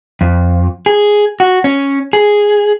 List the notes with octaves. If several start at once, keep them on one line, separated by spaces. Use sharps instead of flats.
F2
G#4
F#4
C#4
G#4